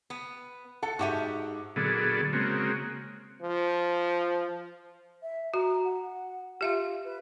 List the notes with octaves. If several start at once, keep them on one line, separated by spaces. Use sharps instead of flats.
B3
A4 F#5 A5 C#7
G#2 F#4 G4 E5 F#5 D#7
A#2 D3 F#3 B3 G#4 A4
C#3 G#3 A#3 C4 F#4
F3
E5
F#4 A#5
F#5
F4 G4 E5 F5
B4